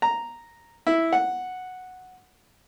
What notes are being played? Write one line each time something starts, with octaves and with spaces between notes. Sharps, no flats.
A#5
E4
F#5